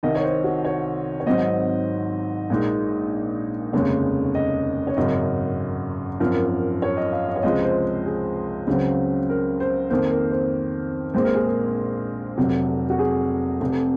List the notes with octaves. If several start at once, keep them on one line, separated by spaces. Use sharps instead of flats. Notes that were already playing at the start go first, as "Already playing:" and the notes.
C2 C3 D#3 D#5
C#5
C5
F#4
C#5
C#5
G#1 G#2 F#3 C4 D#4 D#5
A#1 A#2 G#3 D#4
F1 D#2 C#3 G#3 C#5
D#5
C#5
G#1 F#2 C#3 F#3 D#5
G#1 F#2 F3 A#4
C#5
D#5
F5
D#5
C#5
C#2 C3 F3 G#3 C4 D#5
C5
G#4
C#2 C#3 F#3 C4
A#4
C5
F2 D#3 A#3 C5
A#4
C5
A#1 A#2 G#3 C4 C5
A#4
G#4
A#4
F1 F2 C3 F#3
F#4
G#4
F1 F2 C3